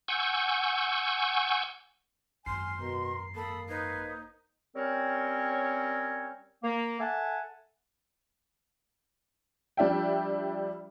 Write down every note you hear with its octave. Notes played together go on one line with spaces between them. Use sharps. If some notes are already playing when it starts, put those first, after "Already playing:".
F#5 G#5 C#6 E6 G6
G#1 F#2 G#5 C6 F6 C7
B2 A#4
A#3 A4 A5 B5 D#6
D#4 B4 C5 G#6
G3 C4 C#4 A#4 C#5
A#3
A4 E5 F#5 G#5 A5
F3 G3 D4 E5 G5